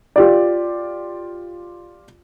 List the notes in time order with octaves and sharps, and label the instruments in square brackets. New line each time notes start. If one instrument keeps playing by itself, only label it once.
[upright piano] F4 G4 D5